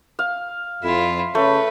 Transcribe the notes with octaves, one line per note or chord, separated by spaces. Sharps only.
F5
F2 E4 F4
C#3 A3 B4 C#5